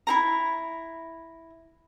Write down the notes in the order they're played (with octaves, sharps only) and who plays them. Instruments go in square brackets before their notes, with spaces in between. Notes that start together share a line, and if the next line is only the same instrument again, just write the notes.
[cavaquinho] E4 G#4 A#5